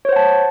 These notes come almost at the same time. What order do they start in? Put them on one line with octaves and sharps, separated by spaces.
C#5 C5 F#5 A5